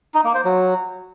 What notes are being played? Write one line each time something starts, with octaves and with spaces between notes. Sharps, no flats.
D#4
A#3
C5
F#3